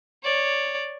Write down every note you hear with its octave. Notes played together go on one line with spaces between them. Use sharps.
C#5 D5